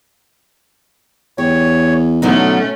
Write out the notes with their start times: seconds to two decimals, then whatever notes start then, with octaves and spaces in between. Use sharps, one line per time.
1.38 E2 G4 C#5
2.22 B2 D3 F#3 A3 C#4 D#4